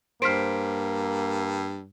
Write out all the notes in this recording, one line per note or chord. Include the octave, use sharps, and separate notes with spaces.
G2 A#3 C5 F6 B6 D7